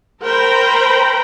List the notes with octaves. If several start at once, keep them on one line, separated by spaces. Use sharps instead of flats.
A#4 C5 G5 A#5 B5